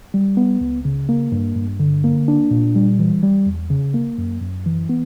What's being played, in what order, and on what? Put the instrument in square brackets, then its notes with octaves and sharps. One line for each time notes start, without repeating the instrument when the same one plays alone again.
[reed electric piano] G3
B3
C#2
C#3
A#3
G2
G2
D3
A#3
D4
A#2
G3
E3
G3
E2
C#3
A#3
F#2
F#2
E3
B3